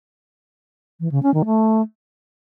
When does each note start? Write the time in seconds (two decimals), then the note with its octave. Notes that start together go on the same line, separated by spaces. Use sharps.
1.00 E3
1.11 C#3
1.23 C#4
1.34 D#3
1.45 A3